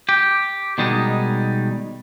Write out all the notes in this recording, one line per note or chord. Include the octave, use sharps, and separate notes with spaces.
G4
B2 D#3 G3 G#3 D#4